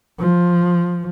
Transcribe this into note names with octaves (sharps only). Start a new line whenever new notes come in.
F3